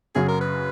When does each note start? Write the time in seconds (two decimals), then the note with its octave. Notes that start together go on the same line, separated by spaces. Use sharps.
0.15 F#2 C#3 F#3 G#4
0.29 A#4
0.41 B4